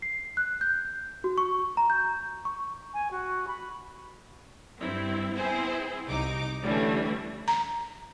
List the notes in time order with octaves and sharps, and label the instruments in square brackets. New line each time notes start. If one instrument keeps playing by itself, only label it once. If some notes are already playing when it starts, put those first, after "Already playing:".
[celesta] C7
F#6
G6
F#4
C#6
A#5
G6
C#6
[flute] G#5
F#4
B5
[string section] G2 C4 E4
B3 C4 E4 G#4 C5
C2 D#4 D6
D3 E3 G3 A3 C#4 D4
[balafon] A#5